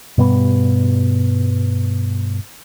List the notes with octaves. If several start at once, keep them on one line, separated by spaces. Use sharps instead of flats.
G2 B2 G3 B3